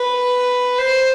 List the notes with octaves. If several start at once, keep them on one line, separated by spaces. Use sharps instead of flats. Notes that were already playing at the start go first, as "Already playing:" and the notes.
Already playing: B4
C5